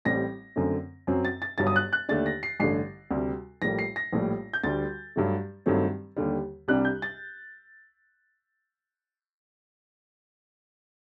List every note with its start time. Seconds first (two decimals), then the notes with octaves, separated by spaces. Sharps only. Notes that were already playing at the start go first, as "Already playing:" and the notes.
0.05 A1 A2 G3 C4 A#6
0.56 F#2 D3 A3 C4
1.07 F#2 F#3 C4
1.25 A6
1.42 A6
1.58 G1 G2 F#3 A6
1.67 D#6
1.76 F#6
1.93 F#6
2.09 D#2 D3 A3 D4 A6
2.26 A#6
2.43 C7
2.60 A1 G2 D3 C7
3.11 D2 C3 G3
3.62 A#1 A2 G3 A#3 A#6
3.79 C7
3.96 A#6
4.13 A#1 A2 G3
4.53 G6
4.64 D2 D3 G3 A6
5.16 G2 F#3 A3
5.66 G2 D#3 F#3 A3 C4
6.16 D#2 D3 G3
6.68 C2 C3 G3 D4 F#6
6.85 G6
7.02 A6